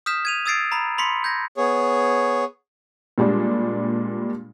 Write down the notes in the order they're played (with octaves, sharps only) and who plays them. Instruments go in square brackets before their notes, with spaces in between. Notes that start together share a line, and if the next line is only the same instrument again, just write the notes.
[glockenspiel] D#6 F6 G6 B6 E7
G#6 D#7 F7
D#6 E6 G#6 A6 C7 D7
A#5 B5
B5 C6 B6 C#7
G6 G#6 A#6
[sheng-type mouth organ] B3 G#4 C#5
[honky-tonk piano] A#2 G3 G#3 D4